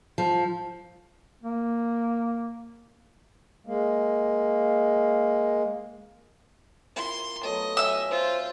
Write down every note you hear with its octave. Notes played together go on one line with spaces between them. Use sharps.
F3
A#3
G#3 A#3
E4 F4 A#4 C6
F#3 A3 B3 D#5
F#3 E5 F5 G#5 E6
F4 C5